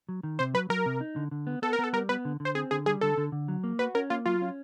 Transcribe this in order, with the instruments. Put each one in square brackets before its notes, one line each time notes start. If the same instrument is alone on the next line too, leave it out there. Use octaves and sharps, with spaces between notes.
[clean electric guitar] F#3
D#3
[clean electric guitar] C3 [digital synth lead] C5
[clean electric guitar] F#3 [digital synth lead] B4
[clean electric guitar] F#3 [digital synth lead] A#4
[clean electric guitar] C3
D#4
D3
D3
B3
[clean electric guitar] B3 [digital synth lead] A4
[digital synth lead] A#4
[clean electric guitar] B3 [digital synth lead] A4
[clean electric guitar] G3 [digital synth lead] A#4
[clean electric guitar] B3 [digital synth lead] B4
[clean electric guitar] D3
D3
[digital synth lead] C5
[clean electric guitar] C4 [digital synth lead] G#4
[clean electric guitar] D3 [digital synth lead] G#4
[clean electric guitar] G3 [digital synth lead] G#4
[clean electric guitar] D3 [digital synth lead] A4
[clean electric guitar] D3
D3
F#3
A#3
[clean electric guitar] F#4 [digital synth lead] B4
[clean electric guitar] C#4 [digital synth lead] A#4
[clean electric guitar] A#3 [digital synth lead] F4
[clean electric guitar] F#3 [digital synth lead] F4
[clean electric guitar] C#4